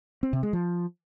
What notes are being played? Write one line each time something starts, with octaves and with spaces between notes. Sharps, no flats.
C4
C3
G#3
F3